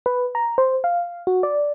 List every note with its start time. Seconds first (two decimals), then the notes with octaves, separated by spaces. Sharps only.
0.06 B4
0.35 A#5
0.58 C5
0.84 F5
1.27 F#4
1.43 D5